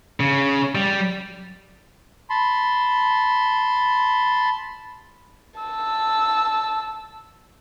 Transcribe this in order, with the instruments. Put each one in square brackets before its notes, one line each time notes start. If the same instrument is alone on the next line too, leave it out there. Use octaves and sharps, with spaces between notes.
[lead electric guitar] C#3
G3
[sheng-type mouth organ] A5 B5 C6
[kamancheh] A5 E6